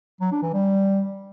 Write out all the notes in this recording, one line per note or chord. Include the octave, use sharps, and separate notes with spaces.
F#3
D4
E3
G3